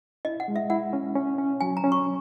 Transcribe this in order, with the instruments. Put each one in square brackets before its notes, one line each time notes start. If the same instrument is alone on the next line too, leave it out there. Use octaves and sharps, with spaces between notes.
[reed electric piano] E4 [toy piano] D#5
[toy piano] F#5
[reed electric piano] G#3
[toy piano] E5
[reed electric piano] E4 [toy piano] F#5
[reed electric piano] C#4
C#4
C#4
[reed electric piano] F#3 [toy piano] G#5
[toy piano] A#5
[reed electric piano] C#4
[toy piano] C#6